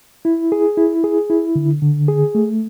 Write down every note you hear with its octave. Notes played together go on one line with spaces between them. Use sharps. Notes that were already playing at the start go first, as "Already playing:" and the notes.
E4
G#4
E4
G#4
E4
D3
D3
G#4
A3